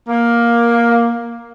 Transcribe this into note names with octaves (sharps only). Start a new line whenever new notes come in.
A#3